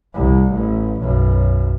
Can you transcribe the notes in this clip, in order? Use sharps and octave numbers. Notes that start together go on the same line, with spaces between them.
C2
A1
B1 F#2